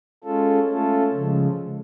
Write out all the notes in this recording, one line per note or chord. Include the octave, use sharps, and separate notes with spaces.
G#3 C#4 F4 A4
A3 C#4 F4 A4
C#3 F3 G#3